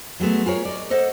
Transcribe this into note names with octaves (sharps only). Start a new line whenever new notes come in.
F#3 G#3 A3 B3
F4 G#4 A#4 C#5
D5 D#5
A4 C5 D#5 F#5